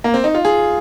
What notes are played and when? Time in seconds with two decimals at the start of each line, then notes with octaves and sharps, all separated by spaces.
0.04 A#3
0.14 C4
0.24 D#4
0.35 F4
0.45 G#4